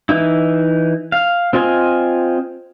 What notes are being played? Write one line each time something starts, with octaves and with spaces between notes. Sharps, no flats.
E3 D#4 E4
F5
C4 F4 D#5 G#5